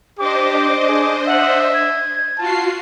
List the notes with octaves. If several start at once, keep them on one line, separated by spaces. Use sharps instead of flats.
D4 G4 C5 D#5 D6
G#4
E5 F#5
G#6
F4 F#4 A5 C7